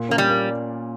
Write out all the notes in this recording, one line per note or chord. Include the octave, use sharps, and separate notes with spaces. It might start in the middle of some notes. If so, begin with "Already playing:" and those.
Already playing: A#2
A#3 C#4
G3
A#3